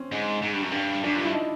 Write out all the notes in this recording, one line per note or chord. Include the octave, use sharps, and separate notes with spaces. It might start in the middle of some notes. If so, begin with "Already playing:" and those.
Already playing: C4 C#4
G#2
G#2
G2
F#2
G2
F#2 D4
G2 F4
E4
D#4